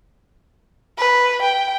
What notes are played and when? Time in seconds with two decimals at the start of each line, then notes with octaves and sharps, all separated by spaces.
0.98 B4
1.42 G5